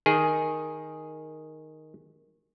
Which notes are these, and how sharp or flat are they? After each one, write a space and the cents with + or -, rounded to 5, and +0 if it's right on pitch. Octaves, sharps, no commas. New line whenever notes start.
D#3 +0 G#4 +0